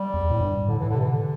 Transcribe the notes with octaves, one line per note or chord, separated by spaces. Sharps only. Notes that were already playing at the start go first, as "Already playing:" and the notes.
Already playing: G3
E2
A2
G2
A2 D3
A2 E3
D3
C3
E3
D3